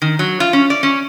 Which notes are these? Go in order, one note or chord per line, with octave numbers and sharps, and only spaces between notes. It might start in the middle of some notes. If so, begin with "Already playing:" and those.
D#3
F#3
F4
C#4
D5
C#4